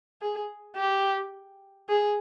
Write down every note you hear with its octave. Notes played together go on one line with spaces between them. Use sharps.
G#4
G4
G#4